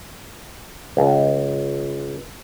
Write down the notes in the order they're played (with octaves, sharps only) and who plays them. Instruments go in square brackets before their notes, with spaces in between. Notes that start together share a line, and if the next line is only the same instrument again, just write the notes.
[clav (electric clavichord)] C#2